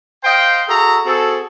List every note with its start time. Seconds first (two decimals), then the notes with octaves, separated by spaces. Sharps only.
0.24 C5 D#5 F5 G5
0.69 F#4 G#4 A4 E5 A#5
1.06 C4 F#4 G#4 A4